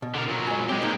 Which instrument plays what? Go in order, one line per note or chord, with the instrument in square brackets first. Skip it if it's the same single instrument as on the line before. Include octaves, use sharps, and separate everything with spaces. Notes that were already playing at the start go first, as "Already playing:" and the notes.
[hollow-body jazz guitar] B2
[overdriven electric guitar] D3 A#4
A#2 F#3
[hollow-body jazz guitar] G#3 G#5
[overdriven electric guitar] G#3 G4 [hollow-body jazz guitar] C4
[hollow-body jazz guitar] A#3 D#4 C5